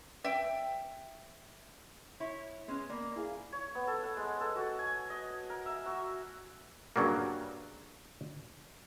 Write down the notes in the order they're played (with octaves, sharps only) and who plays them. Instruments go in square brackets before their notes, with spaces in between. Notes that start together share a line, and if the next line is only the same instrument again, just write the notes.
[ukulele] E5 G5
[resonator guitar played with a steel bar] E4 C#5
[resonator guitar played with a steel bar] G#3 C#4 [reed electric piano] B3
[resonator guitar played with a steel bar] A#3 [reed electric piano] D5 B5
[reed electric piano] E4 G#4 F5
[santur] C#5
B3
A4
F#5
G#3
A4
F#4
G#5
D#5
A#4
E5
F#4
[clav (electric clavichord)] G2 C#3 F#3 G3 A#3